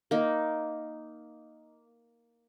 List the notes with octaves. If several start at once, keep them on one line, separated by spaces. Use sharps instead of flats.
A#3 D#4